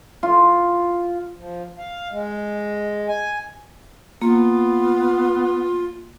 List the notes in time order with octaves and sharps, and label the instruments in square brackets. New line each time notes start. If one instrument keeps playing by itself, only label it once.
[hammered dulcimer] F4
[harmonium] F3
F5
G#3
G#5
[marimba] A#3 [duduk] B3 [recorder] F4